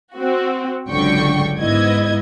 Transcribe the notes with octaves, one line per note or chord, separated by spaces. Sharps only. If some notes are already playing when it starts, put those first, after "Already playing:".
C4 F#4
G#1 C#2 D3 F#3 G5 C#6
G#2 B3 E4 D#5 G#6